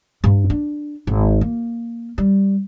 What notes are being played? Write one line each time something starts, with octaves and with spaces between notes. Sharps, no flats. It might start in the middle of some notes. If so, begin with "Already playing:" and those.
G2
D4
G#1
A#3
G3